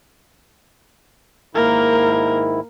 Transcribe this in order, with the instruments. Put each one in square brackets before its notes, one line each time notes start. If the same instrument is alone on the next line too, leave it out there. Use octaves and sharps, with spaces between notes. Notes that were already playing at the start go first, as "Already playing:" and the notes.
[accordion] G#2 D#3 E4 [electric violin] A#3 A#4